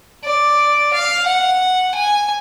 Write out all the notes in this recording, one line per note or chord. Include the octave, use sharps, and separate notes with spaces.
D5
F5
F#5
G#5